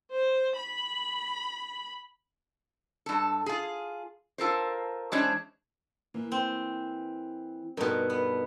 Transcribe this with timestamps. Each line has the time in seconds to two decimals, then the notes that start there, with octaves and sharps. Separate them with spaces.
0.11 C5
0.57 B5
3.06 G2 A4
3.46 F4 G#4
4.38 F4 A4 A#4 C5
5.12 E3 G#3 C#4 D4 C5 C#5
6.14 E3 A#3
6.32 C4
7.77 G2 B2 D#4 A4 A#4
8.10 B3